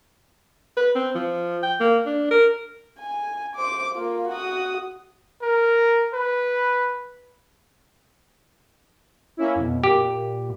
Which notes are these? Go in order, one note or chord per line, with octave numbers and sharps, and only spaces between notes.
B4
C4
F3
G5
A#3
D4
A#4
G#5
C5 D6
A#3 F4
F#4 D#6
A#4
B4
A#3 C#4 E4
F2 B2
A#2 G4